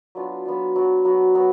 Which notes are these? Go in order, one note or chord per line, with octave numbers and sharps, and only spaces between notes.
F#3 B3 D4 F4
F#3 B3 D4 F4
F#3 B3 F#4
F#3 B3 F#4
F#3 B3 F#4